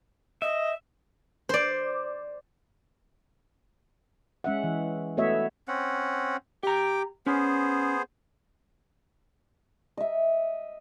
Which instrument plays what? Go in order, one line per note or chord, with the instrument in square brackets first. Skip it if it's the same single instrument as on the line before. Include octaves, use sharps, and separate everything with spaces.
[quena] D#5 [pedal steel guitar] E5
[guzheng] C5 D5
[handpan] G#3 C#4 E5 F#5
E3
A3 B3 F#4 C#5 D#5 E5
[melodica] C4 C#4 F#5
[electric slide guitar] G4 A#5 [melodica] G5 D6
[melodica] B3 G#4 C5 [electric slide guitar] C#4
[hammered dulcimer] D#5 E5